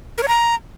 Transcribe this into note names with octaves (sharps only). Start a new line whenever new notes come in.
A#4
C#5
A#5